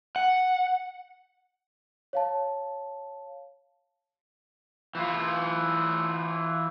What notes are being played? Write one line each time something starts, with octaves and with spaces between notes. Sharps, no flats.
F#5
C#5 F5 A5
E3 F4